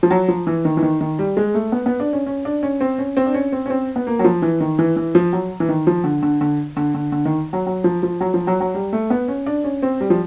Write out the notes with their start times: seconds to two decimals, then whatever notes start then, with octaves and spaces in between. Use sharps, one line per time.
0.03 F3
0.11 F#3
0.28 F3
0.47 E3
0.65 D#3
0.77 E3
0.83 D#3
1.01 D#3
1.19 G3
1.37 G#3
1.54 A3
1.72 B3
1.86 B3
2.00 D4
2.13 C#4
2.27 C#4
2.45 D4
2.63 C#4
2.81 C4
2.99 C#4
3.17 C4
3.26 D4
3.34 C#4
3.52 C4
3.66 C#4
3.70 C4
3.96 B3
4.07 A#3
4.19 F#3
4.24 F3
4.42 E3
4.61 D#3
4.79 E3
4.96 E3
5.15 F3
5.33 F#3
5.60 E3
5.69 D#3
5.87 F3
6.04 D3
6.23 D3
6.41 D3
6.77 D3
6.94 D3
7.12 D3
7.25 D#3
7.53 F#3
7.66 F#3
7.84 F3
8.03 F3
8.21 F#3
8.34 F3
8.47 F#3
8.60 F#3
8.74 G3
8.93 A3
9.10 B3
9.28 C#4
9.46 D4
9.64 C#4
9.82 C4
10.01 G3
10.10 F3